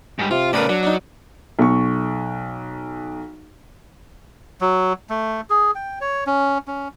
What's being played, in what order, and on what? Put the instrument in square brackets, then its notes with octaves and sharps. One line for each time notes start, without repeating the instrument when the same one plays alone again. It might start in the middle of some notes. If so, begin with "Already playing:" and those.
[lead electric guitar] G#2 G3
[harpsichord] C3 [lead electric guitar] F4
[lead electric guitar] A2 C#3 [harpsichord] A#4 B4 D5
[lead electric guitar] F#3 [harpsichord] D4
[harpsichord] D4 D#4
[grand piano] B1 C#6
[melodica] F#3
A3
G#4
G5
C#5
C#4
C#4